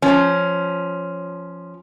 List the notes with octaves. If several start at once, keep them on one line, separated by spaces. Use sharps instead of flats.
F3 C#4